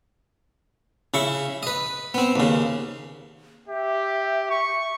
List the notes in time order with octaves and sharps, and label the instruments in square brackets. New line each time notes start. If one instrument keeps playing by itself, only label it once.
[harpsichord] C#3 E4 C#6
B4 D#5
B3 C4
D#2 C#3
[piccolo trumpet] G4 [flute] E5
[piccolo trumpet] C#6